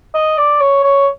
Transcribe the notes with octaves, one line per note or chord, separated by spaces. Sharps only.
D#5
D5
C#5
C#5